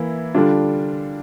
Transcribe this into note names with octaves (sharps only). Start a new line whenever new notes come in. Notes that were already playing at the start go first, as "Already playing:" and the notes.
Already playing: E3 A#3 E4
D3 G3 D4 F4